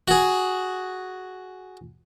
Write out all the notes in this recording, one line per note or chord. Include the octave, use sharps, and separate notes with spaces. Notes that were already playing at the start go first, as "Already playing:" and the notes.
F#4 G#4